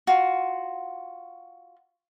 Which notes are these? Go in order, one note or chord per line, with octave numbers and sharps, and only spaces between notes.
F4 F#4